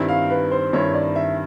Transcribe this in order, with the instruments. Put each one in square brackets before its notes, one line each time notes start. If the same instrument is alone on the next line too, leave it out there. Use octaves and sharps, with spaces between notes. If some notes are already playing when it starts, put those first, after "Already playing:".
Already playing: [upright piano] G2 D#3 G3 C4 E4
[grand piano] F5
B4
C5
[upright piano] G2 D#3 G3 C4 E4 [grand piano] C#5
[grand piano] D5
E5